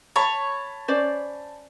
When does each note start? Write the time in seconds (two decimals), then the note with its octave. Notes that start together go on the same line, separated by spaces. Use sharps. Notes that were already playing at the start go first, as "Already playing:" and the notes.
0.16 C#5 A5 B5
0.88 C#4 C5 D5